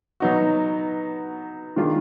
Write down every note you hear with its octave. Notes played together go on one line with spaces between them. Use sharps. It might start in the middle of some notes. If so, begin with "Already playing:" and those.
F#3 B3 D#4 F#4
D#3 G#3 D4 F4